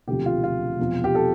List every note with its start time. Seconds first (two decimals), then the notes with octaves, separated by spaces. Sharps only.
0.07 E1 D2 C3 F3 G4
0.26 F4
0.44 F4
0.79 E1 E2 C3 F3
1.04 G4
1.15 A4